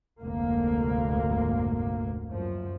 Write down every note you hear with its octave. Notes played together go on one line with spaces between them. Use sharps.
F1 D2 G#2 A#3
F#2 F3